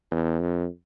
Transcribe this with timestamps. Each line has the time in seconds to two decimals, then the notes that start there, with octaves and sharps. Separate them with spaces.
0.11 E2
0.40 F2